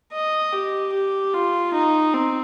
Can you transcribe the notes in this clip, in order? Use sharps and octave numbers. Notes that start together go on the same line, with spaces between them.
D#5
G4
G4
F4
D#4
C4